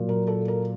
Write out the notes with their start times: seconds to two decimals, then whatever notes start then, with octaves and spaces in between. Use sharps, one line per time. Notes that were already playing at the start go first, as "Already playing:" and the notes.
Already playing: A#2 F#3
0.09 A#4
0.27 A4
0.48 A#4